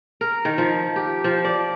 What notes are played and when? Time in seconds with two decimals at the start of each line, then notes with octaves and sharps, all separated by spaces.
0.21 A#4
0.45 D#3
0.58 F3
0.96 G4
1.24 F3
1.44 D5